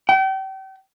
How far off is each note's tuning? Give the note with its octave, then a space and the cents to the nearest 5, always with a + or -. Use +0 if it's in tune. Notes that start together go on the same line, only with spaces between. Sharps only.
G5 -35